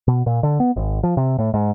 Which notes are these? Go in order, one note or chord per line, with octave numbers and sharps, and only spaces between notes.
B2
A#2
D3
B3
G#1
F3
C3
A2
G#2